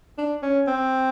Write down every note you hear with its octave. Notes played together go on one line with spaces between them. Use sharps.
D4
C#4
C4